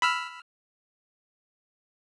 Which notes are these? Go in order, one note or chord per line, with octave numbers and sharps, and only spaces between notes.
B5 E6 F6